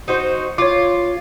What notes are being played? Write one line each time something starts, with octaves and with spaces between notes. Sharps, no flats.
D#4 F#4 C5
F4 C#5 D6